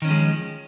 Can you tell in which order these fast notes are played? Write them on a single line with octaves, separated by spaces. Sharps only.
D#3 C#4 F3 G#3